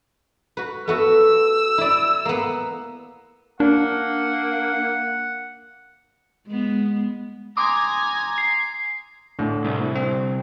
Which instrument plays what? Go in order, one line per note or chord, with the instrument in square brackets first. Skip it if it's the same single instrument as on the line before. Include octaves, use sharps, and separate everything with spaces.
[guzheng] F#4 B4
[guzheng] A3 B3 F#4 [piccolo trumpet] E6
[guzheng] E4 D5
A#3 B3
[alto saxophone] A#3 [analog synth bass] D4 [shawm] F#5
[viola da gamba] G#3 B3
[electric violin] G#5 A#5 [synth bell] C6 D6 D#6
[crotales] C7
[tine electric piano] A2 D3
[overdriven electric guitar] C2
[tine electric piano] C4